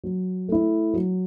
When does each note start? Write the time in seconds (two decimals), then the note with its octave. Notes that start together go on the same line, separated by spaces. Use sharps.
0.04 F#3
0.48 A3 E4
0.94 F#3